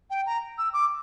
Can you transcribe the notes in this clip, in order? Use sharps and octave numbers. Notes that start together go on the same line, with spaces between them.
G5
A#5
E6
D6